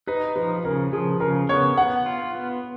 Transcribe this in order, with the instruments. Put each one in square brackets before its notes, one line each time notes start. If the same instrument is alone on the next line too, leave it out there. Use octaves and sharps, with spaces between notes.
[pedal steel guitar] D#4 [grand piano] B4
[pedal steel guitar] F3 [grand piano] B4
[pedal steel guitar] C#3 [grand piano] A#4
[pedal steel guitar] F3 [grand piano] G#4
[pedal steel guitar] C#3 [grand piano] A#4
[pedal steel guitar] B3 [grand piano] C#5
[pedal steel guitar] B3 [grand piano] F#5
[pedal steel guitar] F4
B3